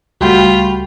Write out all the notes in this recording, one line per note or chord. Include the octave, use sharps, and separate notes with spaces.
C#2 G3 A3 F4 F#4 G5 B5